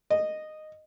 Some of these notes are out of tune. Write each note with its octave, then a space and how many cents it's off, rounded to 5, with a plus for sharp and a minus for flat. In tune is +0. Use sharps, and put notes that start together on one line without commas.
D#5 -10